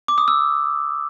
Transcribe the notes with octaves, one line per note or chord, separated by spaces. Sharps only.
D6
D#6
E6